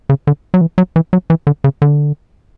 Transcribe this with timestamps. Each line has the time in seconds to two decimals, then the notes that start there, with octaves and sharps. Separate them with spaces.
0.09 C#3
0.27 D3
0.54 F#3
0.61 E3
0.78 F#3
0.96 E3
1.13 F#3
1.30 E3
1.47 D3
1.64 C#3
1.82 D3